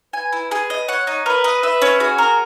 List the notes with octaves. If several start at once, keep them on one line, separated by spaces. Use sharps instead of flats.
B4 G#5
E4
G#4
D#5
C#5 F#5
D#4
A#4 B4
D#5
B4 E5
C#4
F#4 G#4
A#4